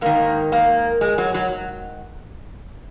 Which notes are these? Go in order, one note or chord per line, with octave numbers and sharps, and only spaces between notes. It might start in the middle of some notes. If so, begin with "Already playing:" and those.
G#2 D#3 A#3
A#3
G#3
F#3
F#3